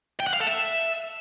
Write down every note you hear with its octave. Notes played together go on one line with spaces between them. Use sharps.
G5
F#5
F5
A4
E5